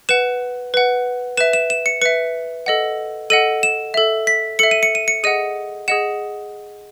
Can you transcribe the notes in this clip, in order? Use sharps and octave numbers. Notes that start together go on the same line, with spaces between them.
B4 F#5 E7
B4 F#5
B4 E5 E7
E7
E7
C#7
B4 E5 C#7
A4 D#5 F#5
A4 D#5 F#5 D#7
E7
A4 E5
B6
A4 E5 C#7
D#7
C#7
D#7
C#7
G#4 D#5 F#5 D#7
G#4 D#5 F#5 E7